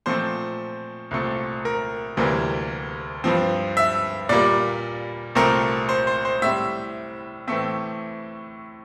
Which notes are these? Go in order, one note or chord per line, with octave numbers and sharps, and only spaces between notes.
A#2 F3 A3 C4 C5
C2 A#2 A3 C4
A#4
D2 C3 E3 G3 A#3
G2 F3 C4
E5
A#2 G3 A#3 D5
C2 A#2 A3 C4 A#4
C5
C5
C5
A2 G3 C4 E5
A2 E3 A3 C4 E5